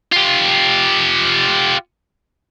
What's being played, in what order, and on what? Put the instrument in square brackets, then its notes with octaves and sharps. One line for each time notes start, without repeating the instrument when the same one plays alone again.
[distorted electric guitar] F4 G4